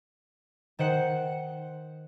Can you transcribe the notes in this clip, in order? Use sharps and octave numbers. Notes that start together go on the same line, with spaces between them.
D#3 C5 F#5 C#7